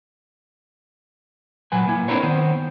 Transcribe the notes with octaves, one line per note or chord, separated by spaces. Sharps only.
A#2 F#3 B4 G#5
A#3 E4
C4 D4 E4 A#4 B4 C#5
D#3 B3 C5